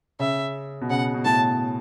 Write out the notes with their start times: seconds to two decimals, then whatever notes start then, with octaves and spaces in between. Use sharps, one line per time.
0.20 C#3 E5
0.81 B2
0.90 C#3 F#5
1.14 B2
1.25 A2 A5